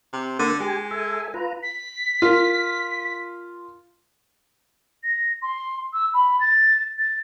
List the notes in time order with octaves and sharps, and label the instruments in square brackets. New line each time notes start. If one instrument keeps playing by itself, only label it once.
[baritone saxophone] C3
[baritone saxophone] D3 [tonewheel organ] A#3 F#5
[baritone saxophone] G#3 [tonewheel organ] G4 G#5
[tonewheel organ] A4 E5 G#5
F4 B4 A#5
[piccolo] B6
[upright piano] F4 A#4
[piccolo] A#6
C6
E6
B5
A6
A6